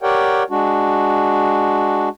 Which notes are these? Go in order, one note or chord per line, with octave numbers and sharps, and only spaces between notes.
G4 A#4 C#5 D5 F#5 G5
G#3 D4 F#4